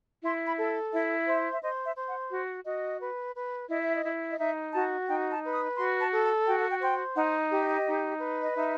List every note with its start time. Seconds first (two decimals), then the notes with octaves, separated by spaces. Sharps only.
0.23 E4 C6
0.46 B5
0.58 A4
0.92 E4 E5
1.27 C5 E5
1.52 E5
1.62 C5 D#5
1.85 E5
1.96 C5
2.08 F#5
2.31 F#4
2.66 F#4 D#5
3.00 B4
3.35 B4
3.70 E4 D#5
3.82 E5
3.94 D#5
4.04 E4
4.32 D#5
4.39 D#4 E5
4.74 F#4 A5
5.08 D#4 G5
5.31 A5
5.43 B4
5.54 D#6
5.77 F#4 C6
6.01 A5
6.12 A4
6.24 A5
6.47 F#4 G5
6.59 F#5
6.70 G5
6.82 C5 G5
7.16 D#4 F#5
7.51 G4
7.62 D#5
7.86 D#4
8.20 B4
8.43 D#5
8.55 D#4 E5